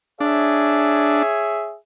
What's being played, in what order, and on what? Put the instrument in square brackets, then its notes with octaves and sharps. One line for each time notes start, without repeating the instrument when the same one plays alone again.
[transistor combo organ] D4 [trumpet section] G#4 C#5 E5